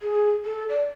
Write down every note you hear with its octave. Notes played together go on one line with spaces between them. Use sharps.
G#4
A4
D5